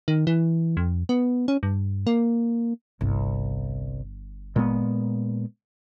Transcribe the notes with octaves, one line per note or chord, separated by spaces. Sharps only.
D#3
E3
F2
B3
C#4
G2
A#3
G1 C2
A#2 G#3 B3